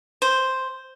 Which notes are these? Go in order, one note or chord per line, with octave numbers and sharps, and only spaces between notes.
C5